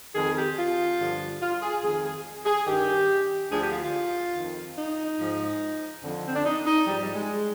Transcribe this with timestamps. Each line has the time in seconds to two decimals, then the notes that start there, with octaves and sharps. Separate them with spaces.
0.15 F2 D#3 G#4
0.37 G4
0.57 F4
0.98 G2 D3 F3
1.41 F4
1.62 G#4
1.83 F2 D#3 G#4
2.04 G#4
2.46 G#4
2.67 G2 D#3 G4
3.51 D2 D3 F3 G#4
3.62 G4
3.71 F4
3.82 F4
4.34 F2 D#3
4.76 D#4
5.18 G#2 F3
6.03 F2 D3 F3
6.26 C4
6.35 D4
6.45 D#4
6.66 D#4
6.86 G#2 F3 G3
7.01 G3
7.14 G#3